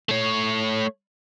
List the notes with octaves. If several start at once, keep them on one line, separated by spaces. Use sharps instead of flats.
A3 C#5